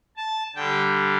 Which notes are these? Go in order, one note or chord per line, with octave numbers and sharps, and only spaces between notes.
A5
D3 G3 G5